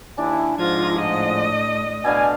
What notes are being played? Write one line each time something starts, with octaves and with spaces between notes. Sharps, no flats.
D#2 D4 E4 G#5
G#2 F3 F4 G#6 A#6
A2 D#5
B2 D3 D5 F5 G#5